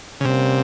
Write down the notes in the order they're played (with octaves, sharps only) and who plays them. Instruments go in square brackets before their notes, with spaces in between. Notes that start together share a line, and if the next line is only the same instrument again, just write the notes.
[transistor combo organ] C#3
[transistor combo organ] C3 [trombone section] G3 A#3 C#4